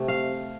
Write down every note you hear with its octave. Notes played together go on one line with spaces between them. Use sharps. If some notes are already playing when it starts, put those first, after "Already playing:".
Already playing: C3 A3
F5